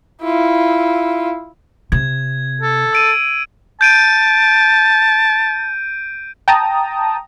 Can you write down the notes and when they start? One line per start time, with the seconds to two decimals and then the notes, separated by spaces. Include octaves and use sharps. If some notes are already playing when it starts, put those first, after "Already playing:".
0.22 E4 F4
1.92 C3 G#6
2.61 A4
2.93 E6 D7 D#7
3.81 A5 G6 D7 D#7
6.48 G5 A5 A#5 D#6